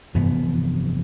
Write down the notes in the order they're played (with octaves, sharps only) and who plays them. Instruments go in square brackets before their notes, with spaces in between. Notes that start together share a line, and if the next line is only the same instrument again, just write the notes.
[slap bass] F1 G2 E3 B3